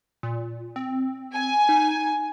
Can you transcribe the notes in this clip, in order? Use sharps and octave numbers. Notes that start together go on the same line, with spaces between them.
A#2
C4
G#5
D#4